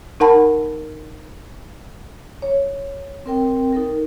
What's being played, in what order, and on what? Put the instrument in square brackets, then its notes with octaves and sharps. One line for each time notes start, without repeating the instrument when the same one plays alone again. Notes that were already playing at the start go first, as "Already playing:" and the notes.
[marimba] D#4 A#4 F#5 A5 B5
C#5
[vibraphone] C4 A#4 G5
D#4 A4 A#4